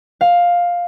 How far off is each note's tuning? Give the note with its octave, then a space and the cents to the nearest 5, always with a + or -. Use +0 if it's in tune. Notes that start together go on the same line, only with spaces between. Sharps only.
F5 +10